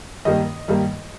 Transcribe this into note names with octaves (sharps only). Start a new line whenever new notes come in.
G2 D#3 G3 A#3 D#5
G2 D#3 G3 A#3